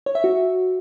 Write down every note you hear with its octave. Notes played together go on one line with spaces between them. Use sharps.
C#5
E5
F#4